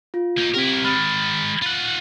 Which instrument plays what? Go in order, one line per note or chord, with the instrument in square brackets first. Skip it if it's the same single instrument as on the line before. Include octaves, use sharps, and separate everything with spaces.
[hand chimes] F4
[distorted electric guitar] A#3 D#4
[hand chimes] C4 G4 [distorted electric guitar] E4 A#4
[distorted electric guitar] D#3 G#3 [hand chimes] B5 F6 A6
[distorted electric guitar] F4 F#5